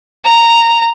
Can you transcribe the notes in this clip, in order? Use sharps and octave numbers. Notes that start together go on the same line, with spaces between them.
A#5